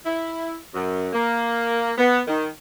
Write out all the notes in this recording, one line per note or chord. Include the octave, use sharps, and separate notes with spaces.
E4
F#2
A#3
B3
D#3